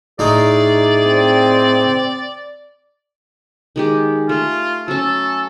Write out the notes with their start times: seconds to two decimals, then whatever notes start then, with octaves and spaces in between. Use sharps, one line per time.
0.19 A2 D#4 G#4 D5
1.05 C4
3.76 D#3 G#3 G4
4.29 A3 F4
4.88 F#3 C#4 A4